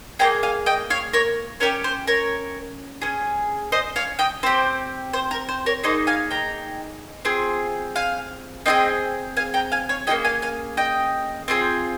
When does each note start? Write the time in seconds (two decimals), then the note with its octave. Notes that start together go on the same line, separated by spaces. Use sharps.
0.19 A#3 C#4 G#4 G5 A#5
0.43 F5 G#5
0.66 D#5 G5
0.90 C#5 F5
1.13 A#4 C#5
1.60 C#4 G4 A#4 C#5
1.84 C5
2.07 A#4 C#5
3.01 C#4 G#4
3.72 C5 D#5
3.96 C#5 F5
4.19 D#5 G5
4.43 C4 G4 C5
5.13 C5
5.31 A#4
5.49 C5
5.66 A#4 C#5
5.84 A#3 D#4 G#4 C5 D#5
6.07 F5 G#5
6.31 G5 A#5
7.25 C4 F4 G#4
7.96 F5 G#5
8.66 C4 F4 G#4 D#5 G5
9.37 F5 G#5
9.54 G5 A#5
9.72 F5 G#5
9.89 C#5 F5
10.07 A#3 C#4 F4 G#4 D#5 G5
10.24 F5 G#5
10.42 F5 G#5
10.77 D#5 G5
11.48 C4 F4 G#4